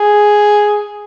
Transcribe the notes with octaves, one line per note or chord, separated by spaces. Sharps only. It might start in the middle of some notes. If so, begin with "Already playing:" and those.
Already playing: G#4